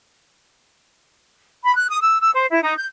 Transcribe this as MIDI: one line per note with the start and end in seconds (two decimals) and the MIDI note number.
1.64 1.75 83
1.76 1.87 90
1.89 1.99 87
2.01 2.20 88
2.22 2.31 88
2.34 2.46 72
2.51 2.61 64
2.63 2.77 63
2.77 2.86 91